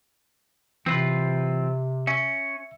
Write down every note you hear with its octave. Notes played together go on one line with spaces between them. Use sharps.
C3 E3 C4 F4 B4
C#4 E5